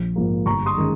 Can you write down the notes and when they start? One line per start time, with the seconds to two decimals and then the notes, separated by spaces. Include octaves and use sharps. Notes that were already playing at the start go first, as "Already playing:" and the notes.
Already playing: A#1
0.16 G#2 F3 A#3
0.46 G1 A#5 C#6
0.66 C6 D#6
0.78 D#3 G#3 C#4